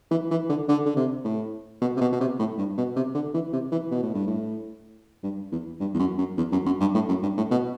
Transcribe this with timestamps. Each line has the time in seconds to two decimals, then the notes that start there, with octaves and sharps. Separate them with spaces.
0.11 E3
0.31 E3
0.49 D3
0.68 D3
0.86 D3
0.96 C3
1.25 A2
1.82 B2
1.97 C3
2.01 B2
2.12 B2
2.21 C3
2.39 A2
2.58 G2
2.78 B2
2.96 C3
3.15 D3
3.34 E3
3.53 C3
3.72 E3
3.91 B2
4.03 A2
4.15 G2
4.27 A2
5.24 G2
5.52 E2
5.80 G2
5.94 E2
5.99 F#2
6.18 F#2
6.37 E2
6.52 F#2
6.66 F#2
6.81 G2
6.95 A2
7.09 F#2
7.23 G2
7.37 A2
7.51 B2